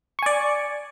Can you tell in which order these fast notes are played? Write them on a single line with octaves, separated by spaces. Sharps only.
C#6 G#5 D5